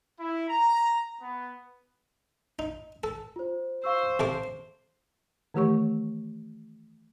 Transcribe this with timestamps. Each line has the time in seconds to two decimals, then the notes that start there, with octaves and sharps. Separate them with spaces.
0.20 E4
0.49 A#5
1.21 B3
2.59 D#4
3.04 A4
3.36 F4 C5
3.84 C5 F5 C#6 E6
4.20 C3 A4 D6
5.54 D#3 E3 A3 G4 C#5 C#6